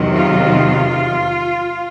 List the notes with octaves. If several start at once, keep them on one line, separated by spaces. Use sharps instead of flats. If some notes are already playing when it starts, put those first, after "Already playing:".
Already playing: E2 C3 D#3 F#3
F4